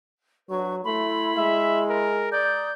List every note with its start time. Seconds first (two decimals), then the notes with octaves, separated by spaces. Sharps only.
0.50 F#3 D4 B4 C#6
0.85 A3 E4 B5 C6
1.37 G#3 E5
1.89 A#4
2.32 D5 A#5 D#6 G6